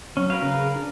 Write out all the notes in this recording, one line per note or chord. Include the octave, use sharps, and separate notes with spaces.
F#3 C#4
A#4 B4 F5
C#3
D4